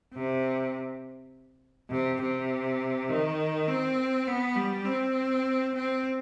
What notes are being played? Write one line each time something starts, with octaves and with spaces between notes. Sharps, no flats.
C3
C3
C3
D#3
C4
B3
G3
C4
C4